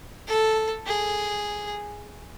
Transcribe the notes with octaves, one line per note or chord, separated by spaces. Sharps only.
A4
G#4